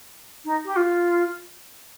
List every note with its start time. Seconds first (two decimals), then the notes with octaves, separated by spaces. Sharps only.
0.45 D#4
0.65 G4
0.76 F4